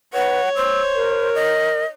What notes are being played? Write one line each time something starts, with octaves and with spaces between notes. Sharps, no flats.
B4 C#5 F#5
C5 E6
A#4
D#5